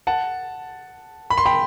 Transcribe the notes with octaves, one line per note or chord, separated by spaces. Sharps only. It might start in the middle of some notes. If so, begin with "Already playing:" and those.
F#5 A5
B5
C6
G5 B5